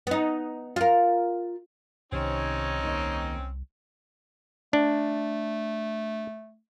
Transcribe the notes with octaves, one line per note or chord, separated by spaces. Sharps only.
B3 D#4
F4 A#4
C2 C3 D#3 C4 C#4 D#4 C#5
D#2 D#5
A3 D4